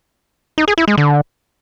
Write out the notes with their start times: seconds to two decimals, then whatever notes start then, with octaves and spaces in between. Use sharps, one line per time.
0.58 D#4
0.68 G#4
0.78 E4
0.88 G#3
0.98 D3